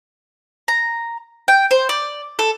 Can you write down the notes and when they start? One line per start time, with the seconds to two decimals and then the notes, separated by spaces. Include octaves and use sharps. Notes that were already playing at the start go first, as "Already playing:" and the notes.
0.68 A#5
1.48 G5
1.71 C5
1.89 D5
2.39 A4